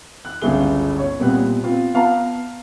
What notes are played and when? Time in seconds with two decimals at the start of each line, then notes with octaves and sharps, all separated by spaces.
0.25 F#6
0.42 G1 C#2 E4 G#4 G7
0.99 C#5
1.19 C2 A#2 G3 B3 C4 F#6
1.63 B3 C4 F4
1.94 B3 F5 A5 A#5